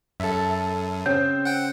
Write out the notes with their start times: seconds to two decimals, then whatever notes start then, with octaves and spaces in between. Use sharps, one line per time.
0.20 F#2 A4 E5
1.06 C#3 C4 G6
1.45 F#5 G5